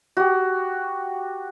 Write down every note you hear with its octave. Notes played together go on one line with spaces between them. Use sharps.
F#4 G4